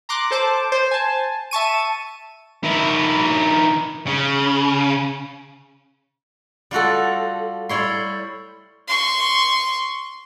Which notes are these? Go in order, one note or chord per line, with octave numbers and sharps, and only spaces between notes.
A#5 C6 D6 F#6
A4 C5 A5 D6
C5
G#5 A5
E5 A5 C#6 D#7
D#3 E4
C#3
G3 F4 F#4 A4
G3 E4 C#5 C6
C6 C#6